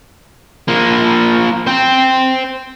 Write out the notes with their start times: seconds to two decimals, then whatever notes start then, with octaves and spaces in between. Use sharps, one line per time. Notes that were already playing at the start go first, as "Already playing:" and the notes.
0.68 F3 A#3
1.67 C5 G5